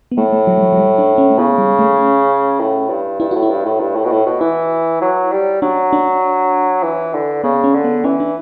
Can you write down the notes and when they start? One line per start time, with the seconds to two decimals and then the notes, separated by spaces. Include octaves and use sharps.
0.12 B3
0.17 A2 A3
0.33 A3
0.47 F#3
0.57 G3
0.62 F#3
0.73 F#3
0.77 G3
0.98 D4
1.18 C#4
1.30 A3
1.38 C#3 B3
1.58 G3
1.79 A3
1.99 C#4
2.59 A2
2.90 G2
3.20 G2 E4
3.31 A2 F#4
3.42 E4
3.50 G2
3.65 A2
3.81 G2
3.96 A2
4.05 B2
4.11 A2
4.26 B2
4.40 E3 E4
5.01 F#3
5.32 G3
5.62 F#3 D4
5.93 D4
6.83 E3
7.14 D3
7.43 C#3 B3
7.64 C#4
7.74 D3
7.84 B3
8.04 E3 C#4
8.20 D4